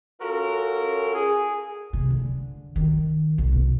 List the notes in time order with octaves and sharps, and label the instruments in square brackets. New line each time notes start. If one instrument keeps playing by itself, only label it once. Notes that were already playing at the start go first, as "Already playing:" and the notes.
[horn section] C#4 F4 F#4 A4 A#4
G#4
[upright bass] C3
D3
D#3
B1
B2